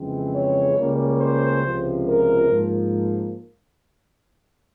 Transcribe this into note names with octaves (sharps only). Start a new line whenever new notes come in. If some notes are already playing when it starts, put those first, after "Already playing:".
Already playing: F2 C#3 E3 G#3 C4
C#5
C#2 C#3 G3 A#3 C#4
C5
C#2 C3 F3
A#4
G#2 F3 A#3